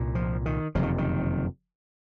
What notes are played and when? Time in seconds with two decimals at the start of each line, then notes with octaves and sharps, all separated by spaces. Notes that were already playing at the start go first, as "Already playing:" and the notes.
Already playing: C2 A#2
0.15 F3
0.46 D#3
0.75 F#1 F2 C3 F3
0.83 D#3
0.98 D#3